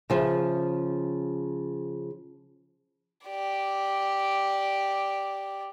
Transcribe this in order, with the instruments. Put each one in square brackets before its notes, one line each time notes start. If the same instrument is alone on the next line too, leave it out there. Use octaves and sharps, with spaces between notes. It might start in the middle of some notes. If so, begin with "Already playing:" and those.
[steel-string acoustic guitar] C#3 F3
[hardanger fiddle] G4 D5